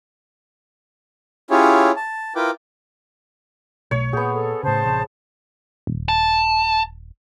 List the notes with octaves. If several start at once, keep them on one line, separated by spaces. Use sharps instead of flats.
C#4 E4 F4 G4 G#4 C#5
A5
E4 F4 A#4 B4 G5 D6
B1 B2 A3 C#5
A#2 B3 G#4 F#5 G6
A4
A2 C#3 C5 A5
A1 C3
D#1
A5